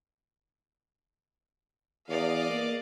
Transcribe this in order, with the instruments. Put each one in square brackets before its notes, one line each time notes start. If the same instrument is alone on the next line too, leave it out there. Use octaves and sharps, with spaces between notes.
[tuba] E2 [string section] D5 D#5 F5
[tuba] A#3